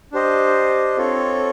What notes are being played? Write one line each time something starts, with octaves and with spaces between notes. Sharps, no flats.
D4 G4 C5 D#5
C4 F4 A4 C#5